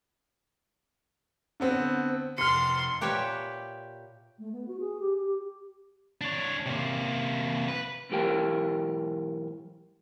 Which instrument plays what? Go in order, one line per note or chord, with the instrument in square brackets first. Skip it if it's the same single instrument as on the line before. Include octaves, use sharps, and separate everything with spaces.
[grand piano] D3 B3 C4
[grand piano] F1 F6 [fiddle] C6 [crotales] C#7
[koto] A#2 G4 B4 C#5 E5 G5
[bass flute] A3
B3
F#4
G#4
G4
G4
[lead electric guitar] D4 C#5
C3 A#3
B4
[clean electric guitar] B1 G#2 E3 G4 A#4 G5